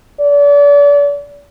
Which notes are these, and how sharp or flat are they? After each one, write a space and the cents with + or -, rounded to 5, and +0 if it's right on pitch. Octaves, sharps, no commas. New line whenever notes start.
D5 -35